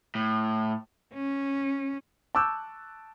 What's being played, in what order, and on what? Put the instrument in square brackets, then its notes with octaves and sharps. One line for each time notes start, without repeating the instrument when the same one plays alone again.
[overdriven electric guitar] A2
[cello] C#4
[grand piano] A5 C#6 D6 E6 F#6 G6